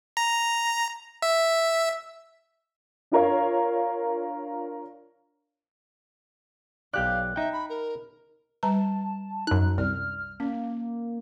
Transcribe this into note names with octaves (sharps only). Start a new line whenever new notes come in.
A#5
E5
D4 F4 A#4 C#5 F5
B1 G4 D5 F5 F#6 G6
D#4 E5 G5
B5
A#4
G3 B4 A5 A#5
F#2 D#4 F#6
C2 D5 F6
A#3 C#4